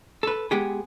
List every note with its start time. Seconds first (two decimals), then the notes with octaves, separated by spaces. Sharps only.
0.23 A4 B4
0.51 G#3 B3 G4 G#4